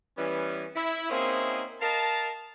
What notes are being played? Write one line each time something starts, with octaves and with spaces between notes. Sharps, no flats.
E3 G3 B3 C#4
E4
A#3 C4 C#4 D#4 G#4 E5
A#4 D#5 F5 A5